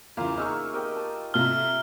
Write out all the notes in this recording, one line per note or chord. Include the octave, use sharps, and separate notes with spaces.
E2 C#3 A#3 F4 A#5
D#4 G#4 C#6 E6 F6
G4 A#4 D#5
A5
C3 F4 A4 E5 A#5 F6